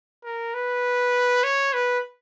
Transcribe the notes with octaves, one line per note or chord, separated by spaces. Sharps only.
A#4
B4
C#5
B4